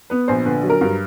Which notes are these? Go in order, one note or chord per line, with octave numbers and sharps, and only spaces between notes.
B3 B4
A#1 C5
D3 B4
F#3
A#4
G2